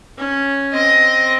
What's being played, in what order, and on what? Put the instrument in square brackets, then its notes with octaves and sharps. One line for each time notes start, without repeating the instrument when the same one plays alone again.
[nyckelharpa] C#4
[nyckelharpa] C4 [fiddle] D#5